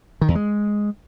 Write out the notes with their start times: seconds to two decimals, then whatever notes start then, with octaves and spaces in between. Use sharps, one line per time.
0.21 D#3
0.28 E2
0.35 G#3